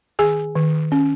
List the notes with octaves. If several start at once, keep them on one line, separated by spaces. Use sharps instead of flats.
D#3 G#4 G#5
D#3
C#4